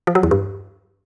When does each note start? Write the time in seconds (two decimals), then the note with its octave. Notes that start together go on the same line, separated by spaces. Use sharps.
0.07 F3
0.15 F#3
0.23 E2
0.31 G2